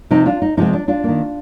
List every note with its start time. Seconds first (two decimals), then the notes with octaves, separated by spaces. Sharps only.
0.11 C3 F3 C4 D#4
0.26 D4 F4
0.42 D#4
0.57 C3 F3 G#3 C4 D#4
0.73 D4
0.88 D4 F4
1.04 D#3 A#3